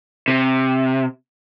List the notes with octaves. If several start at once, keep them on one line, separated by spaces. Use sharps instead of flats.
C3